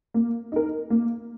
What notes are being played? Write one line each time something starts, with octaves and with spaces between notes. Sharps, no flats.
A#3
D#4 A#4
A#3